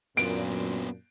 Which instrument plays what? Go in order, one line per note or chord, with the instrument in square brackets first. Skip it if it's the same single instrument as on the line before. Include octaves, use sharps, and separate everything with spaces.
[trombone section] F#2 A#2 [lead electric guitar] B3 D4 [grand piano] D7